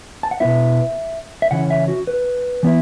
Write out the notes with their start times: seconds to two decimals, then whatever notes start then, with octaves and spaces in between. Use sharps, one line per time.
0.23 A5
0.31 F#5
0.40 B2 B3 E4 E5
1.42 E5
1.51 C#3 E3 C#4 E4 F#5
1.70 E5
1.88 F#4
2.07 B4
2.63 E3 B3 E4